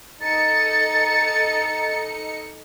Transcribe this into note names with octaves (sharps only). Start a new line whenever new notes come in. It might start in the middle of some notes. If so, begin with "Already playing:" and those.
D#4 A4 A6 C#7